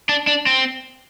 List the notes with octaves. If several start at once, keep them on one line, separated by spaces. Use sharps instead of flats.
D4
D4
C4